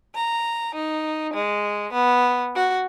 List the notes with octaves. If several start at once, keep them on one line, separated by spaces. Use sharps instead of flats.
A#5
D#4
G#3
B3
F#4